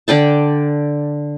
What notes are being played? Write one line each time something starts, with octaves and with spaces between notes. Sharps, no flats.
D3 D5 G5 A5